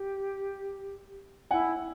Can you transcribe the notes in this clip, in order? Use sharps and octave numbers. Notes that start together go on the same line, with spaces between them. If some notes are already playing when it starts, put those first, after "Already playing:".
Already playing: G4
E4 F#5 G#5